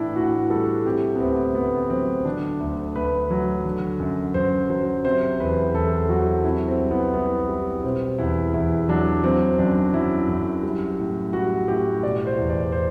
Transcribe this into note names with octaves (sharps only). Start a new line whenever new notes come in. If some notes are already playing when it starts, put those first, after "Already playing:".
Already playing: A2 E3 D4 E4
A2 F#4
G3 A4
C3 G4
B3
D2 C4
D2 B3
F#3 C4
D3 D4
D2
D2 B4
F#3
D3
F#2
F#2 C5
F#3 C5
C3 C5
E2 B4
E2 A4
F#3 F#4
C3 E4
C4
C2
B3
C2 B3
G3
B2 C4
E2 E4
E2 E4
F#3 D4
F#3 C4
F#2 D4
F#3 E4
F#2
G3
A2
G3 F#4
A2 G4
B2 D5
C5
E2
D5
C5